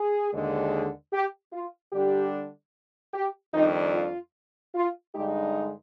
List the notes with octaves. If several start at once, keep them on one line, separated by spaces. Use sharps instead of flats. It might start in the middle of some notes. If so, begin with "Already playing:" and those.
Already playing: G#4
D#2 D3 G#3
G4
F4
D3 G3 D4 G4
G4
F2 D#3 G3 D4 D#4
F4
F4
G2 D3 G#3 D#4 G4